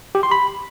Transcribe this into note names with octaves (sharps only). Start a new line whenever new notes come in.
G4
C6
B5